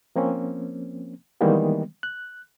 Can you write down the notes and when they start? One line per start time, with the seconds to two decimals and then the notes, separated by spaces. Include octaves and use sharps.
0.16 F3 A#3 C4 C#4
1.41 D#3 E3 G3 G#3 A#3 B3
2.03 F#6